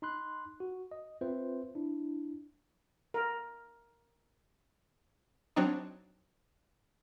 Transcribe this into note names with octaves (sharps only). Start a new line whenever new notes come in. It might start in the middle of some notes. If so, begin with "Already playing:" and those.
D#4 B5 C6 F#6
F#4
D#5
C4 F4 B4 C5 E5
D4 E4
A#4
F#3 C4 D4 D#4